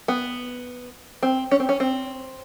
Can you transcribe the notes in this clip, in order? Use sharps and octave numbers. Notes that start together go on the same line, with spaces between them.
B3
C4
C#4
C4
C#4
C4